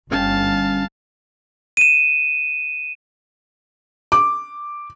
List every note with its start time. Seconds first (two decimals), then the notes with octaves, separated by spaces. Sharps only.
0.11 G1 C#4 F5 G5 A5
1.77 D#7 E7
4.12 D6